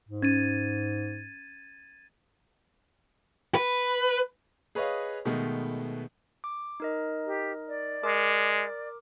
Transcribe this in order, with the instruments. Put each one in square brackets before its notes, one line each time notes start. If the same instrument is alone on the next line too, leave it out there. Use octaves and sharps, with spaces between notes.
[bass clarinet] G#2
[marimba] C#4 [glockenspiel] G#6 A6 D#7
[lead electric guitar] B4
[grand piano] G#4 B4 C#5 D#5 F5
B2 D#3 G#3 A3 B3
[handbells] D6
D#4 A#4 D#5
[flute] G4
D5
[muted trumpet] G#3 [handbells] A#4 D6